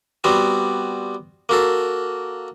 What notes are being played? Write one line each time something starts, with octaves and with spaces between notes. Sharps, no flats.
G3 B3 C4 F#4
A#3 F#4 A4